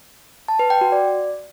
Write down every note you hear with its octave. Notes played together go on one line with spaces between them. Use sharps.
A5
B4
G5
F#4
D5